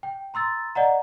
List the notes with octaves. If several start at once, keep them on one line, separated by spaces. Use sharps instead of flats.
G5
A#5 C6 E6 A6
D5 D#5 F#5 A#5